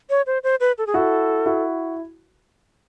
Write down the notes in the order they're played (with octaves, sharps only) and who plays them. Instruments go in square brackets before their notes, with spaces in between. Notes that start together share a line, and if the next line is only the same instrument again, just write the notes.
[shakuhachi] C#5
C5
C5
B4
A4
G#4
[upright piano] E4 F#4 [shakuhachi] A4
[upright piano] E4 F#4